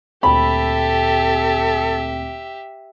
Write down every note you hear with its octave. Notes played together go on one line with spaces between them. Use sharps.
D2 A#2 C4 G4 A4 E5 B5